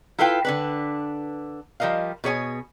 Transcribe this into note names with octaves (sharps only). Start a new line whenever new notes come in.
E4 F4 A4 B4 F5 G5
D3 D4 B4
F3 G3 A#4 D#5 F5
B2 G#4 C#5 G#5